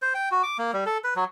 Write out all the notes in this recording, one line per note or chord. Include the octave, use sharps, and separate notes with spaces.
C5
G5
F#4
D6
A#3
G3
A4
B4
F#3